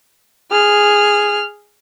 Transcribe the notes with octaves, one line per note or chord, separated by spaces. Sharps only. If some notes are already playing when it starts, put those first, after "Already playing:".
G#4 F6